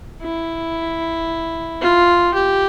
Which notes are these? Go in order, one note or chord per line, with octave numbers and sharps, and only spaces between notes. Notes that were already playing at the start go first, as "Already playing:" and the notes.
E4
F4
G4